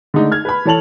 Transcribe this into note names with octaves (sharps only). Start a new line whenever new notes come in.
D3 G#3 A3 D#4
F6 G#6
B4 B5
E3 A4 C#5 A5 F7 F#7